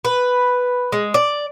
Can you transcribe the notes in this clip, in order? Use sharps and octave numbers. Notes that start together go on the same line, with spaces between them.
B4
G#3
D5